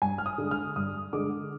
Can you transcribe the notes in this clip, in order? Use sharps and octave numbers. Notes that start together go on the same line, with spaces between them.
G2 G#5
F6
D#6
D3 G#3
F6
G2 D#6
D3 G#3 D6